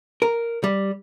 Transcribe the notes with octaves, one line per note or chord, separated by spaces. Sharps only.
A#4
G3